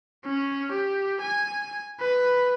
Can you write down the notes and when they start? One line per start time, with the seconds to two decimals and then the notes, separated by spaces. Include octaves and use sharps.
0.24 C#4
0.71 G4
1.21 G#5
2.00 B4